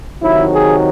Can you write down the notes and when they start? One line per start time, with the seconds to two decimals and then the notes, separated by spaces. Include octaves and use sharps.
0.22 C3 D#3 F#3 E4
0.53 G#4